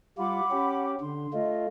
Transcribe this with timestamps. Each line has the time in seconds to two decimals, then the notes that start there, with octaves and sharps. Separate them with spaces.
0.18 G3 F4 F#5 B5 D6
0.51 C#4 G4
1.01 D3 C6
1.33 A3 F4 D#5